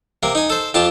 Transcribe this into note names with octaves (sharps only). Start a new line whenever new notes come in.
C3 A#3
D#4 G#5
A4 C5
F2 F4 G4 A5